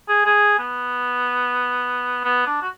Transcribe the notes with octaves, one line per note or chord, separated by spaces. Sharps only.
G#4
G#4
B3
B3
D4
F#4